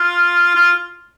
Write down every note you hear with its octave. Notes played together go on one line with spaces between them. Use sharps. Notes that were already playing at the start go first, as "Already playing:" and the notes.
Already playing: F4
F4